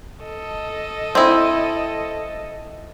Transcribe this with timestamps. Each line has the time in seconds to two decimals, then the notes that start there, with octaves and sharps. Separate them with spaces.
0.23 A4 D#5
1.15 C4 E4